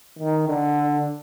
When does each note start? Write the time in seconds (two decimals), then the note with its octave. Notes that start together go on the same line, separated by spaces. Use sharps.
0.19 D#3
0.48 D3